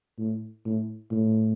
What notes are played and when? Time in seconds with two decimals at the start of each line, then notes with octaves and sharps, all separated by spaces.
0.19 A2
0.65 A2
1.12 A2